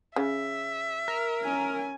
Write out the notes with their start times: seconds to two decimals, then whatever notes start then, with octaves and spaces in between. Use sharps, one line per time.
0.16 C#3 E5
1.08 A#4
1.42 C#4 G#5